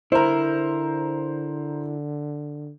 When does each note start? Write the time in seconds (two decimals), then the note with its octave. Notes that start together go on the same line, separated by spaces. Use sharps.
0.12 D3 E4 A#4 C5 A#5